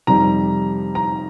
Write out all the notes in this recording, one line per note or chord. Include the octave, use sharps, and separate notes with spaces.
F2 C3 D#3 G3 A#5
A#5